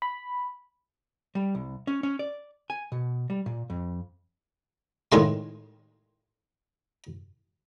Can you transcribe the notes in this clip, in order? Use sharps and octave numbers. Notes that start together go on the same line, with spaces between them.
B5
G3
C2
C#4
C#4
D5
G#5
B2
G3
A#2
F2
A2 D#3 G#3 C6